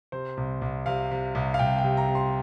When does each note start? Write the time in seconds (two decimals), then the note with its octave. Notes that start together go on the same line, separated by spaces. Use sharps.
0.12 C3 C5
0.37 C2
0.61 C2
0.86 C3 F5
1.11 C3
1.35 C2
1.54 F5
1.59 C2 G5
1.78 G5
1.84 C3
1.97 A#5
2.08 C3
2.15 C6